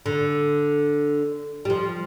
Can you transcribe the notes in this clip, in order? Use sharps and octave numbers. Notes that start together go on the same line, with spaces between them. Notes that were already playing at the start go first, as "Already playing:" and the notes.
D3
G3
F3